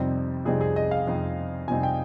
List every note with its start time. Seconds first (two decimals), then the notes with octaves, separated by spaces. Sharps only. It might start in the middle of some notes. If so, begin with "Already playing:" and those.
Already playing: F2 C3 G3 C4 D#4
0.45 F2 C3 G3 C4 D#4 G#4
0.61 G#4
0.76 D#5
0.91 F5
1.07 F2 C3 G3 C4 D#4
1.68 F2 C3 G3 C4 D#4 G#5
1.83 G5